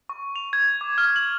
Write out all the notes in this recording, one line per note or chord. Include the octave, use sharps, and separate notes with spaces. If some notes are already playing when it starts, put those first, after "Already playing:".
C#6
F7
G#6
D6
F6
F#7